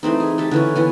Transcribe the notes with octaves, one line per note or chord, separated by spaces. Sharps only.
E3 A3 C4 D#4
G#4
A3 G4 A4
D3 E3 C#4
E3 B3 G#5